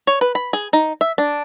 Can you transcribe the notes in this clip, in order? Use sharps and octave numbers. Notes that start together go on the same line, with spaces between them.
C#5
B4
B5
G#4
D#4
E5
D4